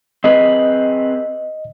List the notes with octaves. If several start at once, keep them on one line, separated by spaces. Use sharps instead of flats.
C4 G#4 B4 D#5